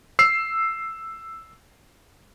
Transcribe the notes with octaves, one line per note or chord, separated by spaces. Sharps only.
E6 C7